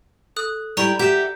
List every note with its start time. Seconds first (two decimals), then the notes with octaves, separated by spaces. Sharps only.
0.36 A4 D#6 F#6
0.77 G3 E4 D5 G5 A#5 C#6
0.99 G4 E5 F#5 G6 E7